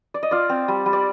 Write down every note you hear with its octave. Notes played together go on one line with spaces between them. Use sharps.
D5
D#5
F4 D5 F5
C4
G3
G3
D5